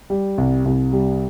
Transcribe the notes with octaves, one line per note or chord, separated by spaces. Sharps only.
G3
C2
C2
G3